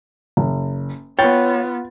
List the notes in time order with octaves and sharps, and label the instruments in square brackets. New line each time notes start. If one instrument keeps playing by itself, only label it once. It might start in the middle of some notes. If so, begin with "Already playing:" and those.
[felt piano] F#1
[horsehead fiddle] B3 F4 [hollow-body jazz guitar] C#5 G5 [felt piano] A6